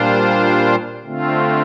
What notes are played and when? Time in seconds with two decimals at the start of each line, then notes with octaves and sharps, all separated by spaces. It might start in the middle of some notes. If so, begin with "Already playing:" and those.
Already playing: A#2 G3 D4 F4 C5
1.04 D3 A3 C4 F4